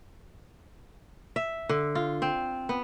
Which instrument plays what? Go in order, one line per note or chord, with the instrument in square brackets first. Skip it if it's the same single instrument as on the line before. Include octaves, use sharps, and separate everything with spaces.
[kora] E5
D3
F4
C4
B3